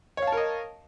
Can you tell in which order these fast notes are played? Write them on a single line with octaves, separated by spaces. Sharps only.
C#5 F5 A5 A#4 D#5